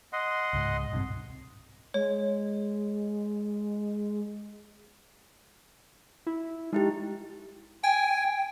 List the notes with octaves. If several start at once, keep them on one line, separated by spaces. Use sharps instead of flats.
D#5 F#5 C6
C#2 G#2
B1 G2 C3
G#3 C#5
E4
G#3 D#4 E4 G4
G5 G#5